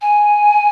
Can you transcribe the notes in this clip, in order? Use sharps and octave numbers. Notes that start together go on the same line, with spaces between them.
G#5